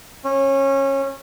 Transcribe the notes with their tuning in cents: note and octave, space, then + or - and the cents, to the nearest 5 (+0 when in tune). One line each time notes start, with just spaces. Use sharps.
C#4 -25